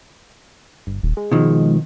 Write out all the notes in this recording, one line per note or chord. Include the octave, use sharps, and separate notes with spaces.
G1
D#1
G#3
B2 D#3 F3